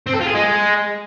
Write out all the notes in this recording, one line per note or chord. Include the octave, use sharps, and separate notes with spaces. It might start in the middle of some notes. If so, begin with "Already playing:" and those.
C4
A4
F4
G#4
G#3